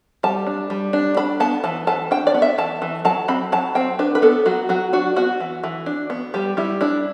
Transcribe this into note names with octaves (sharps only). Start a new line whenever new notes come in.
G3 A5
D4
G3
D4
D4 B5
B3 A5
E3 A5
E3 A5
D4 G5
D5
B3
E5
E3 A5
E3
F#3 A5
C4 B5
F#3 A5
C4 G5
D4 B4
B4
B3 A4
F#3 F#4
F#3 F#4
D4 F#4
B3 F#4
E3
E3
D4
B3
G3 G4
G3 E4
D4 E4